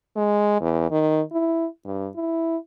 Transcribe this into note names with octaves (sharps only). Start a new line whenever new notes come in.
G#3
E2
D#3
E4
G2
E4